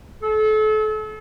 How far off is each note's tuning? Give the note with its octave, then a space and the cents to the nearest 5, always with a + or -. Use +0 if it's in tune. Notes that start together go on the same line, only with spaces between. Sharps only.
A4 -35